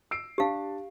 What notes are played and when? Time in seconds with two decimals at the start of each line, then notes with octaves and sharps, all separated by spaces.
0.11 E6 C7 D7
0.38 D4 G4 F5 A5